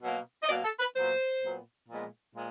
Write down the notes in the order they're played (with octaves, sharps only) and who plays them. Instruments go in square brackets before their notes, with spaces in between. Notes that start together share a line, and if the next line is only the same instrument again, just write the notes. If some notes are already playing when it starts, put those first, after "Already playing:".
[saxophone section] B2 F#3 A#3
D#5
B2 F#3 A#3 D5
A4
B4
A#2 F#3 B3 C5
A#2 F#3 B3
A#2 F3 G#3 B3
A#2 F3 G#3